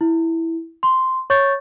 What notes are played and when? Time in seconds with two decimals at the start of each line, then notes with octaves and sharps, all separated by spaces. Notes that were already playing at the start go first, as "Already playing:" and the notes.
0.01 E4
0.83 C6
1.30 C#5 C#6 G6 A6